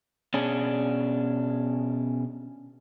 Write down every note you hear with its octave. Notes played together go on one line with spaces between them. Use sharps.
B2 C#4 D4 G#4